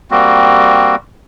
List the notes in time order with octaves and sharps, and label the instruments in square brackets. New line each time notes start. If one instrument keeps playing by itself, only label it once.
[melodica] G3 A#3 C4 F#4